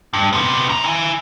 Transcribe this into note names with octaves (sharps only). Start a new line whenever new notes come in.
G2
C3 B3
F#2 A#5
E4 G#5